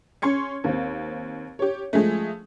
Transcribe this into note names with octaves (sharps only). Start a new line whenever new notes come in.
C#4 C6 G#6 C#7
D#2 C4
G4 C#5
F3 G#3 A3